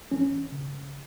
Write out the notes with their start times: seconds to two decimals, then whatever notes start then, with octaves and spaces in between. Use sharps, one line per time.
0.12 E3 C#4
0.52 C#3